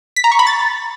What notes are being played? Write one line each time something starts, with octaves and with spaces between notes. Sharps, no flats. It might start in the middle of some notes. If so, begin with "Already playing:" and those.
B6
A#5
C#6
B5
A6